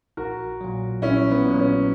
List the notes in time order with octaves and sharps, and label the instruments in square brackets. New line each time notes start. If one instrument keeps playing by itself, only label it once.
[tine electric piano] A#1 [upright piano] F#4 A#4
[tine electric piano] A#2 F#3
[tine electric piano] A#1 [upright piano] C#4 E4
[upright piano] B3
[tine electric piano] A#2 F#3
[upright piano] C#4